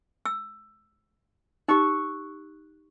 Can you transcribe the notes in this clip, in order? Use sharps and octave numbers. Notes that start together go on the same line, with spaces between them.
E6
D#4 G4 C#6 E6 F#6